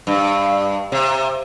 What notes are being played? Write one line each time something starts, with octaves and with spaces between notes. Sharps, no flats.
G2
C3